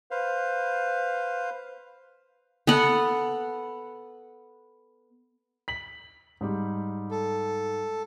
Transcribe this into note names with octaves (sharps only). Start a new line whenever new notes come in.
B4 C5 F5
B3 A4 F#5
B6 F#7
G#2 G3
A4